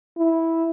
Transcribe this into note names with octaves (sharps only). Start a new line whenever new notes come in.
E4